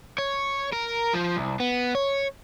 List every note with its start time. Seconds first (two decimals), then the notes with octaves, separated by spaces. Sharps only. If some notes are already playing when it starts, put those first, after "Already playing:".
0.18 C#5
0.73 A#4
1.14 F3
1.36 C2
1.60 B3
1.95 C#5